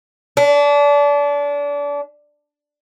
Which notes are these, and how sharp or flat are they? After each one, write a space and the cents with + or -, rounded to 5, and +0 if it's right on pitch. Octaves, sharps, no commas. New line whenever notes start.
D4 -30